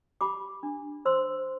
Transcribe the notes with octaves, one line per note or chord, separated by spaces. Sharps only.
G4 B5 D6
D4
C5 C6 E6